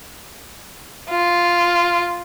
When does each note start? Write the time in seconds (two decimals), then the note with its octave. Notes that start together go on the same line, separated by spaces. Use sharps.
1.10 F4